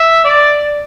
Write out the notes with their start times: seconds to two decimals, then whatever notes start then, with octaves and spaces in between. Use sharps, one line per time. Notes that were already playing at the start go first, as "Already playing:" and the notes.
Already playing: E5
0.25 D5